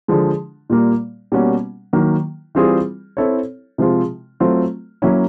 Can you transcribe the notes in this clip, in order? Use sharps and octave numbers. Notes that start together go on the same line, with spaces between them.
D3 F3 G#3
A#2 G3 A#3
B2 G3 A#3 C#4 F#4
D#3 F#3 A#3
E3 G3 C4 F4 G#4
C4 E4 A4 C#5
C3 F3 G#3 C4 F4
F#3 A3 C4 F4
F#3 A#3 C#4 E4